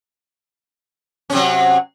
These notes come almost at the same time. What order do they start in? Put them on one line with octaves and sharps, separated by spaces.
C#4 C3 F#3